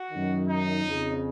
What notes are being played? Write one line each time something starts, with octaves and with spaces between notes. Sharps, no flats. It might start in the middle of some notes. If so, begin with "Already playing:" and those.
Already playing: F#4
F#2 D#3
D#4
F2 C#3